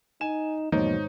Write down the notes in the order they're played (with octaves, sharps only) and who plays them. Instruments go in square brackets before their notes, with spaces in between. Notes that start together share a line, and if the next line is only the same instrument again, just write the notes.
[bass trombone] D#4 [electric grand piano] G#5 E7
[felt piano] G#1 C5 C#5 [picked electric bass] E2 F3 A#3 [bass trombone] B2 [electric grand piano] D#4